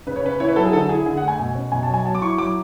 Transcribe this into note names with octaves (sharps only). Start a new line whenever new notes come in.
C#3 B4
C#5
C#4 B4
E4 C#5
B4
F#3 A4
G#4
D3 A4
E4 G#4
D3 G#4
F#5
A3
G#5
B2
C#4
B2 G#5
A5
F#3 G#5
F#3 A5
D6
E4 C#6
F#3 D6